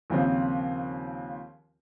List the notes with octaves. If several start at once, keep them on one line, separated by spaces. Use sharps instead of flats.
D#2 C#3 F3 C4 F4